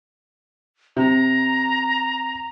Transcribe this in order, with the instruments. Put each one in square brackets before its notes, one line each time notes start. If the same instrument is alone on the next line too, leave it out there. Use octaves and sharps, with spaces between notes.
[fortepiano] C3 [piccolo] A#5